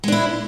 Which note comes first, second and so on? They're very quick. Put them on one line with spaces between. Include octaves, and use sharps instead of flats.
G#3 D4 E4